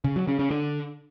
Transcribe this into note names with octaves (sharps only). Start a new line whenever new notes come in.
C#3
F#3
C#3
C#3
D3